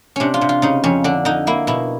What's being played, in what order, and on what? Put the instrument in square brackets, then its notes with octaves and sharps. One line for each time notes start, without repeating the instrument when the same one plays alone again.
[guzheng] C3 C#4 D4
F4
C3
F4
C#3 D#4
F2 C#4
D3 D4
D3 D#4
A#3 E4
B2 E4